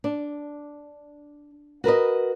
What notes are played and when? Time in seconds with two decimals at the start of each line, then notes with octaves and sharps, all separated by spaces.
0.04 D4
1.84 F#4 A#4 B4 D#5